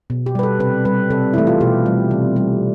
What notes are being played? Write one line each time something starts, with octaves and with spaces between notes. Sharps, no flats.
B2
G4
G3 B4
A4
C3 B4
G3 B4
C3 A4
E3 A3 E4
F4
B2 G4
G3
C3
G3